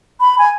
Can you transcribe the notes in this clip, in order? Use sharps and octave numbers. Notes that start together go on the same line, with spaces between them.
B5
G#5